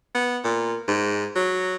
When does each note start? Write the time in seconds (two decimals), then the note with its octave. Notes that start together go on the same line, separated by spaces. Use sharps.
0.15 B3
0.44 A#2
0.87 G#2
1.35 F#3